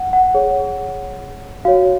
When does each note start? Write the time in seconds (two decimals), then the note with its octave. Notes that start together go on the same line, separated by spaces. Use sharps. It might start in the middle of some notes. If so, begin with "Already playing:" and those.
Already playing: F#5
0.13 F#5
0.34 G#4 C#5
1.65 F#4 C#5 F5